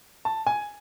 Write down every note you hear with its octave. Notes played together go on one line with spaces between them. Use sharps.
A5
G#5